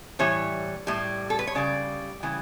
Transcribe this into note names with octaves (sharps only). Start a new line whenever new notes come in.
A2 E3 G3 C#5
A2 G3
A4
B4
C#5
C#3 G3 D5
C#3 E3 G3